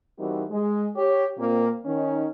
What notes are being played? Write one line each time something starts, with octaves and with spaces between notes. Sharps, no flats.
E3 G3 C4 D#4 F#4 A#4
G#3
G4 C#5
A#2 A#3 C4
D#3 C#4 D#4